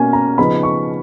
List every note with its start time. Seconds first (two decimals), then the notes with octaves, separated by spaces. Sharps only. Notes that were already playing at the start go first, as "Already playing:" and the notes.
Already playing: B2 A#3 C#4 G#5
0.13 A#5
0.38 C#3 F3 B3 D#4 B5
0.63 C#6